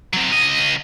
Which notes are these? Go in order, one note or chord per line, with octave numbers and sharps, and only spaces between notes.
F#3 C4
C#2 D#5